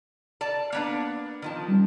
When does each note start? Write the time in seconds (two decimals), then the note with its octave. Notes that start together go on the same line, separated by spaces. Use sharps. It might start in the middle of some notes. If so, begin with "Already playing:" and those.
0.41 D5 A5
0.72 A#3 B3 D4
1.42 D#3 F3 A5
1.68 G3 C#4